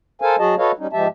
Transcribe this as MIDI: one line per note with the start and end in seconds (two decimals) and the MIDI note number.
0.22 0.36 69
0.22 0.36 70
0.22 0.36 72
0.22 0.36 77
0.22 0.36 80
0.39 0.55 54
0.39 0.55 66
0.39 0.55 68
0.39 0.55 75
0.39 0.55 81
0.58 0.72 66
0.58 0.72 69
0.58 0.72 71
0.58 0.72 73
0.58 0.72 75
0.58 0.72 77
0.78 0.87 55
0.78 0.87 61
0.78 0.87 63
0.93 1.07 44
0.93 1.07 53
0.93 1.07 56
0.93 1.07 67
0.93 1.07 76
0.93 1.07 81